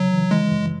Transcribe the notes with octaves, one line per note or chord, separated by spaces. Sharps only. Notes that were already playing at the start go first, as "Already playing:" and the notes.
Already playing: C#3 F#3
E3
E3 G#3
F#2